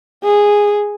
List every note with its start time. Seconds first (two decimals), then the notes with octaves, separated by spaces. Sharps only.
0.24 G#4